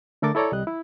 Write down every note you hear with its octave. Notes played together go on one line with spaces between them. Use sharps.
D3 A3 A4 A#4 D6 A6
E4 A4 C#5 D5 A#5
C2 G3 D#5 F#6
E4